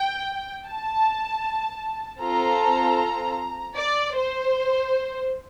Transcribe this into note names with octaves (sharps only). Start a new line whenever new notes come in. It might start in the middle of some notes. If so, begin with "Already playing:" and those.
Already playing: G5
A5
C4 F4 A4 A#5
D5
C5